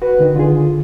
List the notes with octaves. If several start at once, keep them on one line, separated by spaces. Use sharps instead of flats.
F#4 B4
D3 D#3
D3 F4 G#4